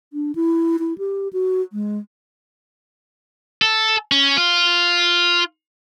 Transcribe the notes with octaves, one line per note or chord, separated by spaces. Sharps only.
D4
E4
E4
G4
F#4
G#3
A4
C#4
F4